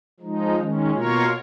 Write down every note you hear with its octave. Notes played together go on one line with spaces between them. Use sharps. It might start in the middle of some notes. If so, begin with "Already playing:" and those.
F3 G#3 D#4
D#3 G#3 C#4
B2 A#3 F4 A#4 C#5